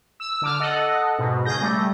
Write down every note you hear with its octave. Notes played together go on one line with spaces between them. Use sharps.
E6
D3 D6 F6
A4 D#5 F#5
G#2 B2
C#3 G#4 G6 A#6
G3 A3